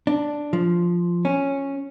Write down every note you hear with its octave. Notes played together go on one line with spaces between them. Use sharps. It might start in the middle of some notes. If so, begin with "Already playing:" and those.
D4
F3
C#4